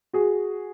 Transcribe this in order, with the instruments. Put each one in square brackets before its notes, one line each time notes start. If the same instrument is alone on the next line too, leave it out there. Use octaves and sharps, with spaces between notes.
[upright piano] F#4 G#4